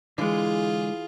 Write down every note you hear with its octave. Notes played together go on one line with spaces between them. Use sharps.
D3 E3 G#3 F4 G#4